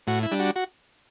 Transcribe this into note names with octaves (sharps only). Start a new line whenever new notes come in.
A2 F#4
E4
G3 D4
F#4
F#4